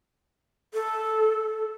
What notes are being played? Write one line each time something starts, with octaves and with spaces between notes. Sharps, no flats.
A4